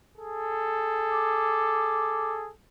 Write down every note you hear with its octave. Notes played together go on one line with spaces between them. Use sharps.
G#4 A4
D6